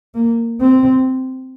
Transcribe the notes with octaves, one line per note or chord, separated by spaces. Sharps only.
A#3
C4